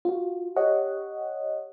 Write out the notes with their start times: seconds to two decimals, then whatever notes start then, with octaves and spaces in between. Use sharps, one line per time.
0.05 F4 F#4
0.56 G4 C#5 D#5 F#5